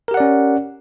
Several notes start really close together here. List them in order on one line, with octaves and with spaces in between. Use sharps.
A#4 G4 F#5 D5 C#4